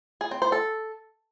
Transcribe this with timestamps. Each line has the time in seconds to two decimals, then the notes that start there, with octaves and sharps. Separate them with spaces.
0.21 G#4
0.31 C4
0.42 C5
0.52 A4